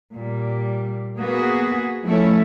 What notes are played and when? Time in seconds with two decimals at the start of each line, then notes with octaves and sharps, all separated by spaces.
0.15 A#2 G3
1.17 A#3 B3 F#4 G#4
2.05 F3 A3 C#4 E4 A4 C#5